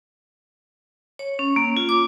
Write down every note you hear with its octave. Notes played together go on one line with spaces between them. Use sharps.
C#5
C#4
A#3
F4
D6